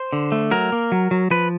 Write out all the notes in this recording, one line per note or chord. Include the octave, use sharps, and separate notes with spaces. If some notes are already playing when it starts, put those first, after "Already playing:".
Already playing: C5
D3
A3
F#3 A#4
A#3
F#3
F#3
F3 B4